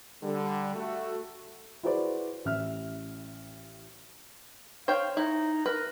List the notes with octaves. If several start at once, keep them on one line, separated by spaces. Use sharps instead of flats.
D3 G3
A3 F#4
E4 F#4 G#4 B4 C5 D5
A1 E5 F6
C5 C#5 F5 G5
D#4 E4
A#4 B4